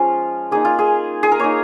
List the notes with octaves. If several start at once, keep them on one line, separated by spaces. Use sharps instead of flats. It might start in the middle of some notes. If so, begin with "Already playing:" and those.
Already playing: F3 G#3 C#4 F4
A#3 D#4 G#4
F4
G#4
G#4
A#4
A#3 D#4 C#5